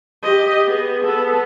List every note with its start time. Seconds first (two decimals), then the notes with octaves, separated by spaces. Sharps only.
0.23 G4 D#5
0.67 B3 G#4
1.04 B3 A4